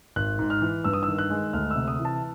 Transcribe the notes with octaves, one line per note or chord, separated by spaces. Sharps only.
G#1 F#6
G#2
F6
E3
G2 E6
D#6
E6
D#3
F#6
G#3
D2 F6
E6
C3
D#6
E3
A5